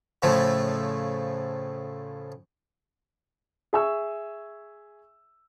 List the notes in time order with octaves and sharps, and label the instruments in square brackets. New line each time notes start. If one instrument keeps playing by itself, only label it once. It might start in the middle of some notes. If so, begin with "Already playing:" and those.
[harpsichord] A2 C#3 F3 A3
[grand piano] G#4 E5 G#5 C#6 E6